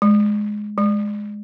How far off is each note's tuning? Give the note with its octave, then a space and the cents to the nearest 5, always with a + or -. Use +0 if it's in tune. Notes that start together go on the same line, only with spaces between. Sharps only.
G#3 +10
G#3 +5